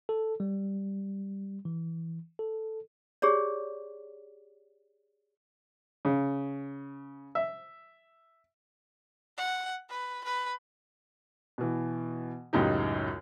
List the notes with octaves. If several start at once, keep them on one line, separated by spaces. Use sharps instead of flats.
A4
G3
E3
A4
G4 G#4 C#5 D5
C#3
E5
F#5
B4
B4
B2 E3
C#2 F#2 A2 D#4 G4